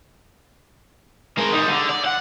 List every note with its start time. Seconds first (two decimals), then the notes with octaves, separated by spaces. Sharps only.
1.38 G#3 A#4
1.53 G3 D#4
1.68 D3
1.89 D5
2.05 F#5